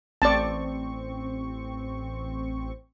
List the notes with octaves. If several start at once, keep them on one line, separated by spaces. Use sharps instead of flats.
A1 C4 D5 A5 C#6